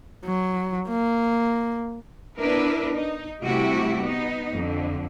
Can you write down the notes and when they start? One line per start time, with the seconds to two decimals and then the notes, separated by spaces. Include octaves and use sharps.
0.25 F#3
0.88 A#3
2.38 B3 D4 E4 A#4 B4
2.93 D#4
3.44 C3 G3 A3 E4 F#4 G4
4.02 B3 D#4
4.53 F2 D3